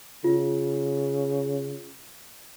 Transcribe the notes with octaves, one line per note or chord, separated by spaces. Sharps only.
C#3 F4